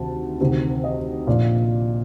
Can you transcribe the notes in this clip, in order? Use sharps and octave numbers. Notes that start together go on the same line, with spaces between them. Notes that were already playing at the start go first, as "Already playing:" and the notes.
Already playing: D2 C3 D#3 A5
D2 C3 D#3
D#5
A#1 A#2 D5